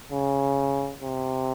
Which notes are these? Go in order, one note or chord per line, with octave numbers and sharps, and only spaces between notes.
C#3
C3